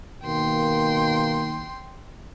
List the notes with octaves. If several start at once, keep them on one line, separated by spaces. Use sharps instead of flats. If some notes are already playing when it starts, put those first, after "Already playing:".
B2 D#3 A#3 G5 C6